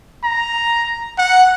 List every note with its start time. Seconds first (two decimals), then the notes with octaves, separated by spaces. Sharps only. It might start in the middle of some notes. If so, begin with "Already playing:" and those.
0.24 A#5
1.18 F#5